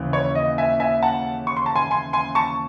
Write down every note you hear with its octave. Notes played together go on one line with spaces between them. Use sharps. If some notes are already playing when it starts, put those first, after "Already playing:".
Already playing: D#2 C#3 E3
C#5
D#5
E5 G#5
E5 G#5
F#5 A5
C#6
C6
A5
G#5 C6
G#5 C6
G#5 C6
A5 C#6